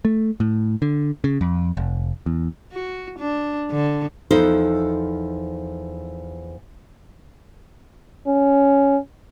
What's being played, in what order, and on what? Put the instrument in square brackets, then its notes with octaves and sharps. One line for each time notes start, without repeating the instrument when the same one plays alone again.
[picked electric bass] A3
A2
D3
C#3
F2
F1
E2
[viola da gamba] F#4
D4
D3
[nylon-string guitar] E2 F3 D#4 A4 C5
[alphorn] C#4